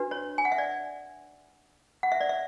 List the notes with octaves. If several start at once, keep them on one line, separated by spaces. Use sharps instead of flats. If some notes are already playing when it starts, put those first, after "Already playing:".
Already playing: D4 F#4 B4
C#5
G#5
F#5
E5
D5
F#5
E5
D5
E5